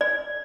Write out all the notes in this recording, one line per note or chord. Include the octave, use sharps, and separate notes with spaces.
D5